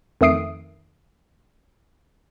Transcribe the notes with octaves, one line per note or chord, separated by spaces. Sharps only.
F2 D#3 A3 D#6 C7 D7